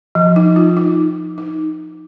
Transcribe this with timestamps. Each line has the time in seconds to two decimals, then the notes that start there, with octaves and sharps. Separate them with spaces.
0.15 F3
0.36 D#4
0.56 F4
0.77 D#4
1.38 D#4